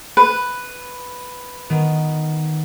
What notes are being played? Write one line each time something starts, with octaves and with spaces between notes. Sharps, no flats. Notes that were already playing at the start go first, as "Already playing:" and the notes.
B4
D#3 B3